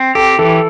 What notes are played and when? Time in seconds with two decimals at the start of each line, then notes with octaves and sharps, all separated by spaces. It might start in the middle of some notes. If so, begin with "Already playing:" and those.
Already playing: C4
0.15 G4 A4
0.39 E3 A4